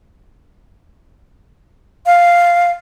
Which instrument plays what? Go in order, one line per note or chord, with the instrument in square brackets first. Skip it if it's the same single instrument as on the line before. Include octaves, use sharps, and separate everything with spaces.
[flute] F5